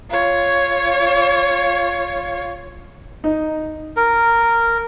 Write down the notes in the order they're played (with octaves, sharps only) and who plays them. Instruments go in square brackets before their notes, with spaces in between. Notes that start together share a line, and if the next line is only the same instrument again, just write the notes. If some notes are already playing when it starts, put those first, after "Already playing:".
[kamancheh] F4 C#5
[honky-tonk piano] D#4
[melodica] A#4